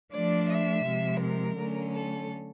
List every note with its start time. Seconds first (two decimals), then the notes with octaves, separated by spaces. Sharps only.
0.13 F3 A3 D4 D5
0.49 E5
0.85 C3 F3 G#3
1.22 A#4
1.58 D3 F#3 A3 C#4
1.94 A4